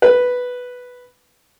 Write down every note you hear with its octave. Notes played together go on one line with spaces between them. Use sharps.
B4